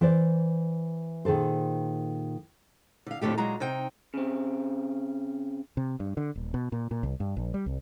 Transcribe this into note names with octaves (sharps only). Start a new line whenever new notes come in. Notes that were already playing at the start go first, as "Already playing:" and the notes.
E3 C5 D5
A#2 D#3 G#4 A4 C5
D3 F5
F2 A2 D3 A3 G4
A#2 F#3 G#3 A#5
C3 D#4 G5
C#3 C4
C3
G2
D3
D#1
B2
A#2
A#2
C2
G2
A#1
G3
C2